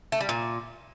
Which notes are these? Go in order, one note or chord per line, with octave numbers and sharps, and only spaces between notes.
A3
G3
A#2